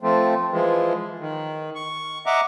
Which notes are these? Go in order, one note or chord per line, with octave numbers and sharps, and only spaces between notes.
F3 A3 C4
E3 F3 G#3
D#3
C#6
D#5 E5 F#5 A#5 D6